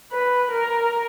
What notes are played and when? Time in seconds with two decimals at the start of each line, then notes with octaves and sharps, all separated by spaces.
0.12 B4
0.51 A#4